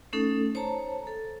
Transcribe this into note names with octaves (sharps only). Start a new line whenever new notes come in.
A3 C#4 D#4 A4
C5 C#5 A5 A#5
A4